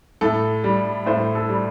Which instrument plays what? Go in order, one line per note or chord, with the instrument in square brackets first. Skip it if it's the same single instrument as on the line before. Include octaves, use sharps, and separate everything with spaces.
[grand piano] A2 A4
G3
A2 C5
A4
G3